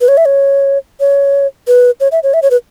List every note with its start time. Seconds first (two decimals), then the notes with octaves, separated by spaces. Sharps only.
0.01 B4
0.08 C#5
0.17 E5
0.25 C#5
1.00 C#5
1.67 B4
2.00 C#5
2.12 E5
2.23 C#5
2.34 E5
2.42 C#5
2.51 B4